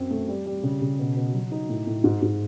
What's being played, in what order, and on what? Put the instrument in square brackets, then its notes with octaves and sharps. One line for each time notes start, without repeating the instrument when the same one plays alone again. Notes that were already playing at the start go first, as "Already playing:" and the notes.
Already playing: [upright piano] F#2 C4
A3
G3
G3
C#3
C#3
B2
B2
F#3
D#4
A2
A2
G#2
G#2